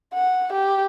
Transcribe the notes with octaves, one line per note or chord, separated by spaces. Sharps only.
F#5
G4